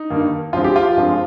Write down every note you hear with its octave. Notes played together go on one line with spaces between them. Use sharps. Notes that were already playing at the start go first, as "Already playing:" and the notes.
Already playing: D#4
G2 D#3 A#3
G2 F3 G#3 C4 F4
G4
F4
G2 F3 G#3 C4